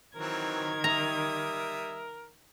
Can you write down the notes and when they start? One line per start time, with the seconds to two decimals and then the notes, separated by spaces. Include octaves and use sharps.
0.16 D#3 E3 F#3 C4 A#4 G#6
0.84 G3 E5 A#5 D#6